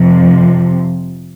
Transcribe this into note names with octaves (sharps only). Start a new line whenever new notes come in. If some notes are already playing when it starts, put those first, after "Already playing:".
Already playing: F2 C3 F3